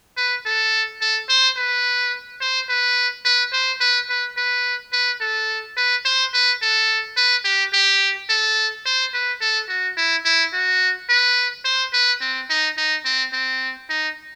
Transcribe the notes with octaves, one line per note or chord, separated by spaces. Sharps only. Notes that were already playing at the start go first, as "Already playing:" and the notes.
B4
A4
A4
C5
B4
C5
B4
B4
C5
B4
B4
B4
B4
A4
B4
C5
B4
A4
B4
G4
G4
A4
C5
B4
A4
F#4
E4
E4
F#4
B4
C5
B4
C4
D#4
D#4
C4
C4
D#4